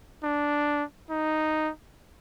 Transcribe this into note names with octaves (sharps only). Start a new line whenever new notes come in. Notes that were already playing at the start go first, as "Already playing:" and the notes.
D4
D#4